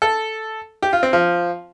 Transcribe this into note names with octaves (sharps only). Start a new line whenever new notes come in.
A4
G4
F4
C4
F3